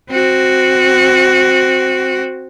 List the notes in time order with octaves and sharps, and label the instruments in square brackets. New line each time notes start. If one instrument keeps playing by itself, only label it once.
[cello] C4 F#4